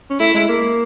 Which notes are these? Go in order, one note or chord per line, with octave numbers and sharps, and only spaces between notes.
C#4
A3 E4
G#3
A#3